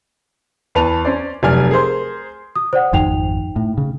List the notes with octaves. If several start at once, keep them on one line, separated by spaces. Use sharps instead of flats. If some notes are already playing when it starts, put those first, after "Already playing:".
E2 B4 A5 F7
C#4 C5 D5
F1 F#3 D5 G#5 F6
G#4 A#4 C5 C6
D#6
C5 D5 F#5
G#1 F2 D#4 G5 F7
A2
C#3